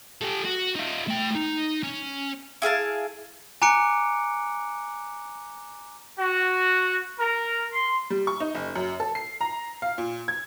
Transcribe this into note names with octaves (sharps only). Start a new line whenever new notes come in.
G4 A4
F#4
D#4 F4
A3 G5
D#4
C#4
E4 G#4 F5 A5
G#5 A#5 D6 F#6 C#7 D7
F#4
A#4
C6
G3
C#6
D#4
F#1
F#2
A4
C7
A#5
F5
A#2
G#6